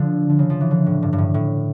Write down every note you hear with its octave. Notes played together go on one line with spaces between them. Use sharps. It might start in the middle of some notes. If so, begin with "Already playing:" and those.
Already playing: D3 F3
D3
C#3
F3
E3
D3
A2
G2
G2
A2
A2